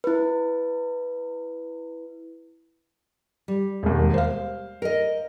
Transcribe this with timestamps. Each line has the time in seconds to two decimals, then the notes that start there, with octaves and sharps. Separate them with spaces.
0.04 E4 B4
3.48 G3
3.83 E1 D#2
4.14 C5 F5
4.82 A#4 D#5